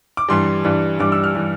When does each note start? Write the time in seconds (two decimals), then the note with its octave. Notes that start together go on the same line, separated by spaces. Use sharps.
0.17 D6
0.29 G2 E3 G3 C6
0.65 G2 E3 G3
1.00 G2 E3 G3 D6
1.12 E6
1.24 F6
1.35 E3 G3